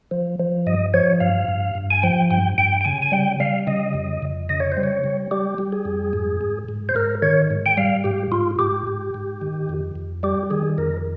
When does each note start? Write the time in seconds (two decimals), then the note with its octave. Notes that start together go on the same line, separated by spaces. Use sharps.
0.11 F3
0.40 F3
0.66 G2 D#5
0.94 F3 C#5
1.20 G2 F5
1.48 G2
1.75 G2
1.90 G#5
2.03 F3 G5
2.30 G2 G5
2.58 G2 G5
2.81 G5
2.85 C#3 G#5
3.02 G#5
3.12 G3 G5
3.40 G3 F5
3.67 C#3 D#5
3.94 F2
4.22 F2
4.49 C#3 D#5
4.60 C#5
4.72 C5
4.77 G3
4.83 C#5
5.04 G3
5.31 G3 G4
5.58 G3
5.72 G#4
5.85 F2
6.13 G#2
6.41 G#2
6.69 G#2
6.89 C5
6.95 G#2 A#4
7.22 D#3 C#5
7.51 G#2
7.66 G5
7.77 G3 F5
8.04 G#2 G4
8.32 G#2 F4
8.59 G#2 G4
8.87 G#2
9.14 G#2
9.41 D#3
9.69 F2
9.95 F2
10.23 G3 G4
10.50 D#3 G#4
10.78 F2 A#4